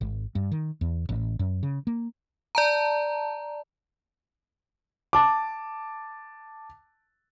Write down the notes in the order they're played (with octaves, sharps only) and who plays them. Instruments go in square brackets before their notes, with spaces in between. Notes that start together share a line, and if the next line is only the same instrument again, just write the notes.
[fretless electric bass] G#1
G2
D#3
E2
A1
F#2
C#3
A#3
[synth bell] D5 A5 A#5
[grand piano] A5 D6